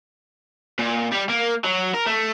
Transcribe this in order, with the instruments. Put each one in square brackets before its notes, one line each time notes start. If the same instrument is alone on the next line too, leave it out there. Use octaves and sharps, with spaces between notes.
[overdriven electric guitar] A#2
G3
A#3
F#3
A#4
A3